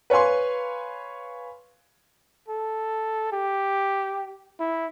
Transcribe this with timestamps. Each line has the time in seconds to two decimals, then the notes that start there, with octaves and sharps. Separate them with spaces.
0.10 B4 C#5 F5 G#5 C6
2.48 A4
3.32 G4
4.60 E4